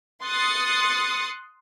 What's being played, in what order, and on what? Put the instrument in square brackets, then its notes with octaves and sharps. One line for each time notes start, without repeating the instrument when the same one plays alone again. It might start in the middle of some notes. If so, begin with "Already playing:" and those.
[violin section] C6 D#6 F#6 A6 C#7